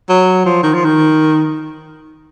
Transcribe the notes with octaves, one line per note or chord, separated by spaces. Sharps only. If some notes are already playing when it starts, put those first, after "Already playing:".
F#3
F3
D#3
F3
D#3